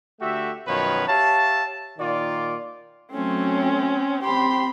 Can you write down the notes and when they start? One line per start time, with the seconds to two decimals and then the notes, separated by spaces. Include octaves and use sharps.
0.20 D3 A3 F#4 G4 E5
0.67 F#2 B2 D#3 F3 B4 C#5
1.07 G4 C#5 E5 F5 A5
1.98 A#2 D#3 F4 D5
3.13 F#3 A3 C4 C#4
4.23 C4 G4 B5 C6